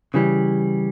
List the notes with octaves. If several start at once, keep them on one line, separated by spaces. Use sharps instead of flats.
C#3 E3 G3